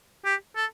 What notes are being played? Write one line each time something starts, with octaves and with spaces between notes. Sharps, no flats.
G4
A4